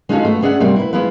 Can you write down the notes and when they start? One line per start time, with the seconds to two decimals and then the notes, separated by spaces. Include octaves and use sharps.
0.09 G#3 C#4 D#4 F4 F#4 A4
0.25 A3 B3
0.42 C#4 G#4 D5 E5 F#5
0.60 C3 G3 A3 A#3 C4
0.76 E4 B4
0.93 G#3 B3 E4 F4 B4